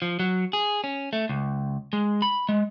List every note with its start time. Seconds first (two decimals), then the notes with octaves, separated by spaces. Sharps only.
0.02 F3
0.19 F#3
0.53 G#4
0.84 C#4
1.13 A3
1.29 C#2
1.93 G#3
2.22 B5
2.49 G#3